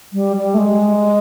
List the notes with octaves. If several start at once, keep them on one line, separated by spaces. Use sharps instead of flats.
G3
G3
A3
G#3